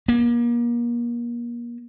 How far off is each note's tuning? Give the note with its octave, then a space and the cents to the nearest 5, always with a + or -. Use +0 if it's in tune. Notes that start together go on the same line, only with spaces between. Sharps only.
A#3 +35